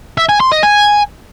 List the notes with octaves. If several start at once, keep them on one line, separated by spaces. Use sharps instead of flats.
E5
G#5
C6
D#5
G#5